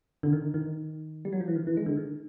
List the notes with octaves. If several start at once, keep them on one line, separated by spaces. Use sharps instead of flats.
D3
D#3
D#3
G3
F#3
F3
E3
D#3
E3
G#3
D3
D#3